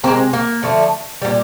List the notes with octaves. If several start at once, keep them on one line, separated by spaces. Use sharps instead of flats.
C3 E3 G#3 A#3 C4
A#3
D3 F3 A3
A#2 G3